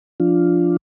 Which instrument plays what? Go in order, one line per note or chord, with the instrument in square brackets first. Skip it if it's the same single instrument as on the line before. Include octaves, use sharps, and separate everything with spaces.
[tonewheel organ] F3 D4 F4